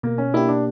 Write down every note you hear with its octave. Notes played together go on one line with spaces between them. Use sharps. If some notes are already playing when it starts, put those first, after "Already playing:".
B2 A#3
C#4
A#3 D4 E4 G4
D4